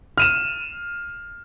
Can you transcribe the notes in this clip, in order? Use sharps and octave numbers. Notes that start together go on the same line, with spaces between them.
F6 D#7 E7